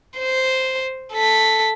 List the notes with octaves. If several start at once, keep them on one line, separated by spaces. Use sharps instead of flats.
C5
A4 B6